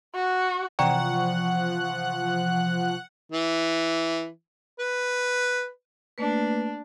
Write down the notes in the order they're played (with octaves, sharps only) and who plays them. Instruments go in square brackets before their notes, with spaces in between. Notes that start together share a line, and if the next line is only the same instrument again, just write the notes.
[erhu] F#4
[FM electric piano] C3 E3 C#6 [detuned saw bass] F3 [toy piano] D5 G5 A#5 [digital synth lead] F#5
[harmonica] E3
B4
[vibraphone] A3 A#3 B4 [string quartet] D4